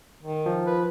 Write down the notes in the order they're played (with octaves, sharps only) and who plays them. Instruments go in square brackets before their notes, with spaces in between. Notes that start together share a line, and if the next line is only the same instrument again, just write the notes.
[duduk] D#3
[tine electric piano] F3
[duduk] B4